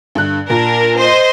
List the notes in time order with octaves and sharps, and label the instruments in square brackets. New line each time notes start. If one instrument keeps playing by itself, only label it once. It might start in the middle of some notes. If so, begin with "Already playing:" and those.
[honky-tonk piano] G2 D3 F#6
[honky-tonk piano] A#2 [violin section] D4 A#4
[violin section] C5 D#5 C6